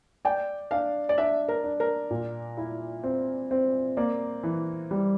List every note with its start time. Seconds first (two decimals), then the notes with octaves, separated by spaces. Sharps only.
0.25 D5 G5
0.71 D4 F5
1.09 D5
1.18 D4 E5
1.48 A#4
1.64 D4
1.80 A#4
2.11 A#2
2.57 E4
3.03 C4
3.51 C4
3.97 A#3 D5
4.43 E3
4.91 G3